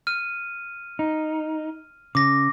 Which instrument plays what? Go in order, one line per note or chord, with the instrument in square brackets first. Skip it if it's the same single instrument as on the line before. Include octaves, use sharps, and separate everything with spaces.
[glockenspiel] F6 D#7
[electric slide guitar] D#4
[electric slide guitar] C#3 [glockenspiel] D6 A#6